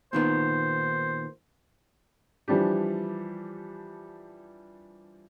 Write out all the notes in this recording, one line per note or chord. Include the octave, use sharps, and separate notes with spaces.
A#2 D#3 B3 C5
E3 F3 G3 D4 G4